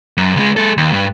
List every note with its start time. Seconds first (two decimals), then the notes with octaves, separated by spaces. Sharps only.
0.17 F#2
0.36 C#2 G#3
0.57 G#3 A4
0.77 D#2
0.93 G2